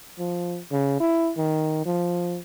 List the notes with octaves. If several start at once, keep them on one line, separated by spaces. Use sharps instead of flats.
F3
C#3
E4
D#3
F3